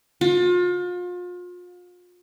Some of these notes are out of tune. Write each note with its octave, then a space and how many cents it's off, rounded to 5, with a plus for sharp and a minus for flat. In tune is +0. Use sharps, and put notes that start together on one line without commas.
F4 +35